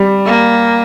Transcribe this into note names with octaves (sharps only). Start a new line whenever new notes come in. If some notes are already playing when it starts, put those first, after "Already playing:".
Already playing: G3
A#3